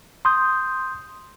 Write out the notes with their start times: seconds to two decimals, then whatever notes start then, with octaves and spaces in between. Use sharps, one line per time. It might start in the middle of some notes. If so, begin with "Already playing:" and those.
0.25 C6 D#6 G6